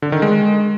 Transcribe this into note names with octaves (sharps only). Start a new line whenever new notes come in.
D3
D#3
G#3